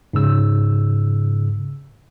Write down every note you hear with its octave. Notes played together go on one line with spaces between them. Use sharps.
G#2 C#3 E6